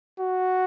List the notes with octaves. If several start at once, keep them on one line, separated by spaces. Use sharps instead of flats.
F#4